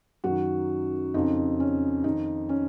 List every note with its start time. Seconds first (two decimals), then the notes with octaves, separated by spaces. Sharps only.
0.24 F#2 D#3 F#4
1.14 F2 C#3 D#4
1.60 C#4
2.04 F2 D#3 D#4
2.49 C#4